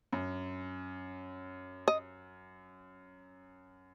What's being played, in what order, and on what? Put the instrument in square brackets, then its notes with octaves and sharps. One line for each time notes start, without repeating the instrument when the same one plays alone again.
[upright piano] F#2
[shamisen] D#5